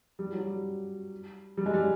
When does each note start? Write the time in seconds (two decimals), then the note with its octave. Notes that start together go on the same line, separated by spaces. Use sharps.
0.19 G3
0.33 F#3
0.46 G3
1.57 G3
1.66 G#3
1.74 G3